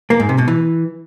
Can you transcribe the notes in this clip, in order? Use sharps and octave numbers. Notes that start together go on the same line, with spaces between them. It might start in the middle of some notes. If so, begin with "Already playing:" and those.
A#3
G#2
C3
B2
E3